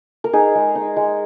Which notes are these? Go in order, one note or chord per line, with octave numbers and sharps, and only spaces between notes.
A#4
D#4 G#4
G#3
D#4
G#3